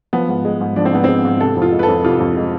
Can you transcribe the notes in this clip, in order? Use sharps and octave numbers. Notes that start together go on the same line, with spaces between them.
F3 B3
G#2
G#3
G#2
F3 D4
C4
G#2 B3
G#3 C4
G#2
C3 A4
F2
F4
G#3
B4
A4
F2
C3 F4
F2
G#3